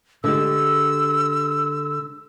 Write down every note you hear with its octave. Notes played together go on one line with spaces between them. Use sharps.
D3 G#3 G4 E6